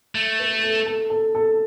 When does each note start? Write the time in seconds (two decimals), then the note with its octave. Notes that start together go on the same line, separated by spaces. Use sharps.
0.15 A3
0.40 B4
0.64 A4
0.86 A4
1.10 A4
1.35 A4